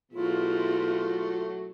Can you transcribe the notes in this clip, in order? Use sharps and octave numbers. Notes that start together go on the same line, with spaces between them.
B2 F#3 A3 E4 F4 G#4